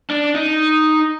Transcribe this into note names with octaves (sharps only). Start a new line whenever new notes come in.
D4
D#4